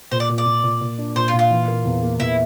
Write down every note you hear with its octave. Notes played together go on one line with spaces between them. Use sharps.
A#2 C5
D5
A#2
D5
A#2
A#2
A#2
D4
A#2 C5
F4
A#2
F4
E3
A#3
E2
A#3
E2 E4